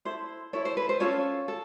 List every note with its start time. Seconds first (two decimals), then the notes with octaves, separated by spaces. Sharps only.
0.05 E4 A4 C5
0.53 E4 A4 C#5
0.65 C5
0.77 B4
0.89 C5
1.00 C#4 F4 A4 C#5
1.48 A4